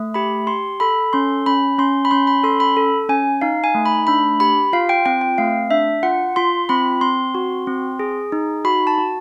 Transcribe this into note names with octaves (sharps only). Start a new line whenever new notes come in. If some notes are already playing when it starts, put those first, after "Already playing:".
Already playing: A3
G4 B5
G4 C6
A4 B5
C#4 C6
C#4 B5
C#4 C6
B5
C#4 C6
B5
A4 C6
B5
A4
C#4 G#5
D#4 F5
G#5
A3
B5
D4 B5
G4 B5
F4 F5
G5
C4 G5
G5
A3 F5
D4 E5
F4 F#5
F4 C6
C4 B5
C4 C6
F#4
C4
G#4
D#4
F#4 B5
A5
F#4